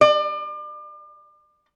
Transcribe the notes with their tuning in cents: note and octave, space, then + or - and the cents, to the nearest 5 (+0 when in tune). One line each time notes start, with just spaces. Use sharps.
D5 +35